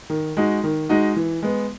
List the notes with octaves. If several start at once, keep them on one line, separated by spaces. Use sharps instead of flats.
D#3
G#3 D#4 F#4
D#3
G#3 D#4 F#4
E3
G#3 B3